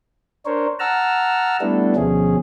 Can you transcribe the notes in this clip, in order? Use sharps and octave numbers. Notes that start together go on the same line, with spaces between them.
D4 A#4 C5 C#5
F#5 A5 A#5 E6 F6
G3 A3 B3 D4 E4 A4
D2 B2 F3 C#4 G#4